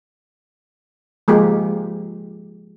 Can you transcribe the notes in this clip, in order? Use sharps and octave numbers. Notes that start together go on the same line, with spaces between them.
F3 G#3 A#3 G4